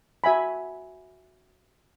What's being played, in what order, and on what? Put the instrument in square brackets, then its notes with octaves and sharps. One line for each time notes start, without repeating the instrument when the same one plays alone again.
[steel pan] F#4 E5 G#5 B5